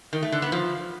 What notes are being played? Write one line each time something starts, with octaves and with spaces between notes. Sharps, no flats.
D#3
A3
D3
B3
F3